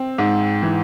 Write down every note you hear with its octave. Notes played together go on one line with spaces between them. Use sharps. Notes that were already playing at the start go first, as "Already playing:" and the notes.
Already playing: C4
G#2
E3